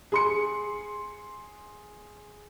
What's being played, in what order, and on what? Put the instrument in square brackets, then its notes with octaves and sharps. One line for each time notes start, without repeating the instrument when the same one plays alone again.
[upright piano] G#4 C6 C#7